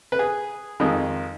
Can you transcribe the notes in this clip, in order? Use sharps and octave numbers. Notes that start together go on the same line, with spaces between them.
B4
G#4
F2 D#3 G#3